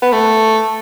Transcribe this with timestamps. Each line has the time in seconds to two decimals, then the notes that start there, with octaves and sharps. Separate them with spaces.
0.02 B3
0.13 A3